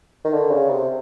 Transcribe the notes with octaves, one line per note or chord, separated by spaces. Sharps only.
D#3
D3
C#3
C3